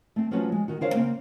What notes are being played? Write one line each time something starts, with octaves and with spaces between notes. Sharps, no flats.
A3 C4
F3 F#3 A3 C#4 F#4 B4
G#3
D#3 F#4
D3 A#4 C5 C#5 F5
C#3 A#3 C4